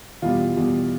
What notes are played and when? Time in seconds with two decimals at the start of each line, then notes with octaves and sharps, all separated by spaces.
0.22 E2 B2 G3 F4
0.57 E2 B2 G3